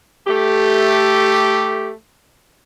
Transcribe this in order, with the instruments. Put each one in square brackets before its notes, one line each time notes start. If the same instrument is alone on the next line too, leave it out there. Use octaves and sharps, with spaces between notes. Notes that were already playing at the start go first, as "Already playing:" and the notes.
[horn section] A3 G4